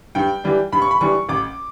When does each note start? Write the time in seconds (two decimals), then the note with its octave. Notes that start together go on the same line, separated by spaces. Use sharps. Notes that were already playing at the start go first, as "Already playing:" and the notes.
0.15 G2 G5
0.44 E3 G3 D4
0.72 G2 B5
0.82 C#6
0.91 B5
1.01 E3 G3 D4 C#6
1.29 A1 D6